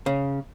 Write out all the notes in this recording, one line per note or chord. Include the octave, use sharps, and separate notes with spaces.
C#3